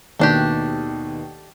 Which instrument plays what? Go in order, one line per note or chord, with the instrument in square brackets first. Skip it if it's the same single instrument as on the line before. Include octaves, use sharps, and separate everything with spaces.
[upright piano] D#2 B2 D#3 [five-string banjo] A3 D4 G4